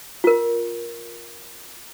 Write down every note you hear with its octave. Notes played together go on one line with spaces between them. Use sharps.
F4 A#4